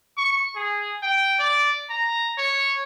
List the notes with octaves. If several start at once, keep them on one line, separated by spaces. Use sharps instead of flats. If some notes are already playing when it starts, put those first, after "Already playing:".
C#6
G#4
G5
D5
A#5
C#5